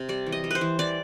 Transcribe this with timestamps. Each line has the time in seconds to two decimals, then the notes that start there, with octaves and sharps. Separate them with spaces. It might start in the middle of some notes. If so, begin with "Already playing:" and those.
Already playing: C3
0.09 G3 D5
0.26 E3
0.32 D#5
0.44 G3
0.51 B4 C5
0.61 E3
0.79 E3 D5